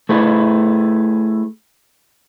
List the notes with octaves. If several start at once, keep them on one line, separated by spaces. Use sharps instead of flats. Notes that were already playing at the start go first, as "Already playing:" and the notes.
A3 E4 G#4 B4